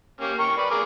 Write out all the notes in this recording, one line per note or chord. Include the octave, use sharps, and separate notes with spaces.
A#3 C#4 G4
A#4 G5 C#6
B4 D5
G#4 A#4 D6